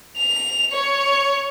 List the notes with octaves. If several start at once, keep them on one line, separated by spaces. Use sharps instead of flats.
F7
C#5